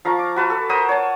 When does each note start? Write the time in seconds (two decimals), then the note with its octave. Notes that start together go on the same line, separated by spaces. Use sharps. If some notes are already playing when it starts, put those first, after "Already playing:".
0.05 F3 F5 A#5 C#6
0.19 D6
0.36 F#4 B4 A5
0.50 A4
0.69 A#4 C5 F#5 D#6
0.89 C#5 A5